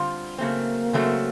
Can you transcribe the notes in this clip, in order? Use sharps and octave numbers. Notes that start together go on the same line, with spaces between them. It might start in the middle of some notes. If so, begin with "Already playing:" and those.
Already playing: D3 G3 C4 F4
C#3 F#3 A3 A#3 C4
C#3 F#3 A3 C4